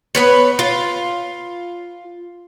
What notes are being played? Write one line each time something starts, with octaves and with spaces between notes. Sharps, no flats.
B3 B4 C#5
F4